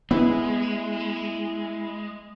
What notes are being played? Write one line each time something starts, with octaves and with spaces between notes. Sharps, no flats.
G#3 B3 E4